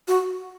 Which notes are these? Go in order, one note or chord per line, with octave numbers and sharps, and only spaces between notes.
F#4